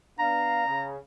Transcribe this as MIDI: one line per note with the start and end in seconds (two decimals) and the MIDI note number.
0.19 0.63 59
0.19 0.63 62
0.19 0.63 77
0.19 0.87 82
0.66 0.96 49